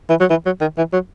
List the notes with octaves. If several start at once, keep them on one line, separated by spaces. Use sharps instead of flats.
E3
F#3
E3
F#3
D#3
E3
F#3